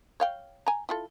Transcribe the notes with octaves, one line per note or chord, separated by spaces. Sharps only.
C#5 F5 G5
G#5 A#5
E4 F4 A4